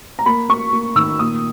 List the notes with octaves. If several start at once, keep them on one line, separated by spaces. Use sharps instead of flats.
A#5
A#3 B5
A#3 C#6
A#3
D#3 E6
A#2 D#6